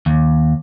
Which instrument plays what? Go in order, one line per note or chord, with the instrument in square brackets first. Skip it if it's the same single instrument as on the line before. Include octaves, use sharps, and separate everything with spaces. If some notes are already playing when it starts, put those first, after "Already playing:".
[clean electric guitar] D#2